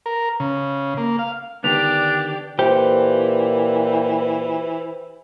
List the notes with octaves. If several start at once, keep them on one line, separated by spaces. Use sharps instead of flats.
A#4
C#3
A#3
F5
D3 D#3 B3 D4 G4 D5 F7
A#2 E3 G4 C5